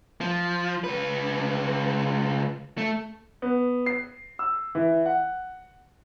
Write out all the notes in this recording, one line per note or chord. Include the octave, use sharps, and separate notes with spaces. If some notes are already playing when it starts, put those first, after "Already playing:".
F3
C#2 B4
A3
B3
C7
E6
E3
F#5